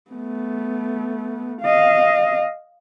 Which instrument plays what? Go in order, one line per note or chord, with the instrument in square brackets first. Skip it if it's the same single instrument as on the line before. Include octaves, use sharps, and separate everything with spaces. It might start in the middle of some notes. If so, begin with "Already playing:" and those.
[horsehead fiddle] A3 B3
D#5 F5